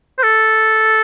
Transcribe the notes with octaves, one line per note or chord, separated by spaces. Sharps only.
C5
A4